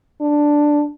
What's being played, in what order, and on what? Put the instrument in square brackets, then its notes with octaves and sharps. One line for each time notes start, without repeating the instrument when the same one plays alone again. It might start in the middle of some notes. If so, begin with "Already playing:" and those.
[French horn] D4